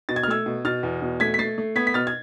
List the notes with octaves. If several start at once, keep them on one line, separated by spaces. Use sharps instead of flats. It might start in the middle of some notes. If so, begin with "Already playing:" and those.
B2 A6
G#6
F6
A3 E6 G#6
B2
B2 F6 A6
E2
B2
A3 G#6 B6
B6
A3 A6 C7
A3
B3 G#6 B6
B6
B2 F6 A6
G#6